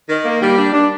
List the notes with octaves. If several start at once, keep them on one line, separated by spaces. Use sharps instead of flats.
D#3
A#3
G3
D4
D4